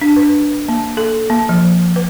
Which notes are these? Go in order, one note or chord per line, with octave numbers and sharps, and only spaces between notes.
D4
B4
A#3
A4
A#3
F3
B4